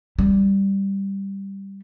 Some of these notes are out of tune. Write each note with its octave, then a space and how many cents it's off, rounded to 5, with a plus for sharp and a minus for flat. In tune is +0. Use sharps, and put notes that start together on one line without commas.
G3 +0